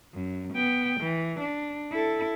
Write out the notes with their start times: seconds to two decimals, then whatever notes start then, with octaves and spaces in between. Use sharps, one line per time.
0.14 F#2
0.54 B3 G5
1.01 E3
1.40 D4
1.91 E4 A4